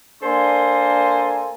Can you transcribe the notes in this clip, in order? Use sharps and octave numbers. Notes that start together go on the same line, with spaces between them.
A#3 D4 A4 C5 G#5 C6